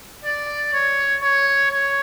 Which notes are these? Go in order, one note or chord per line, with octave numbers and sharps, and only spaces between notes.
D5
C#5
C#5
C#5